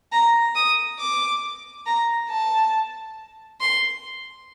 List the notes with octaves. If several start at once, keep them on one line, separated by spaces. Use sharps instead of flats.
A#5
D#6
D6
A#5
A5
C6